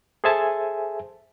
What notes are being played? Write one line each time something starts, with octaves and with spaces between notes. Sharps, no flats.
G#4 A4 C5 E5 G#5 A5